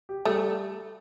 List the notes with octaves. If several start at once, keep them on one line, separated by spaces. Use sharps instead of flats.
G4
G3 A3